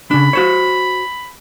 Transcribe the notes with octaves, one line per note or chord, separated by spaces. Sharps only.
C#3 D4 B5
F#4 C5 C#5